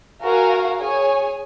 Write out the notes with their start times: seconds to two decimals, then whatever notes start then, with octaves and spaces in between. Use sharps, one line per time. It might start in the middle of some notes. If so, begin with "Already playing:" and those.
0.22 F#4 A#4 F5 G#5
0.78 G#4 C#5 G#5